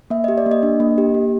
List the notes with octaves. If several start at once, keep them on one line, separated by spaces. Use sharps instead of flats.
A#3 E5
G4 D#5
D5
A#3
D#5
D4
A#3
G4
A#3